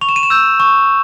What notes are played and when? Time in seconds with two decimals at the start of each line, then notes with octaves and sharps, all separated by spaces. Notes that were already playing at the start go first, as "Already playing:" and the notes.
0.01 C#6 F7
0.09 E7
0.16 D#7
0.23 E7
0.30 E6 G6
0.60 C#6